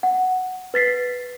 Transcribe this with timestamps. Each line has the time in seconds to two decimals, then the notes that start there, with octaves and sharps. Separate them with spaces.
0.03 F#5
0.74 B4 A6 B6 C7